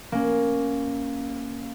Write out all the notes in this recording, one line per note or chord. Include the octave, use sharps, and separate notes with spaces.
A#3 C#4